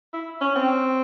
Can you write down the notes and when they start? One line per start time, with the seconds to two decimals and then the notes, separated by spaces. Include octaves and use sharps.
0.13 E4
0.41 C#4
0.55 C4